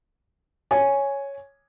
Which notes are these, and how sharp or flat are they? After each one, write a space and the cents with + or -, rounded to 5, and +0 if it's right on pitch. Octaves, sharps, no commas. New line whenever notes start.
C#5 +0 G#5 +0